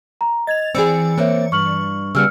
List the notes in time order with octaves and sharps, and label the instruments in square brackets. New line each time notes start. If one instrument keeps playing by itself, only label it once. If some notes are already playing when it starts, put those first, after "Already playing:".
[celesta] A#5
[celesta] D#5 G#6 [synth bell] A6 F7
[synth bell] E3 D5 C#7 [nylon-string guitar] C4 G#4 [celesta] E6
[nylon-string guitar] A#3 C4 [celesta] C5 C#5 E5
[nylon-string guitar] G2 [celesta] C#6 F6 F#7
[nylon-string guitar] C#3 G3 B3 [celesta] E6 F6 C#7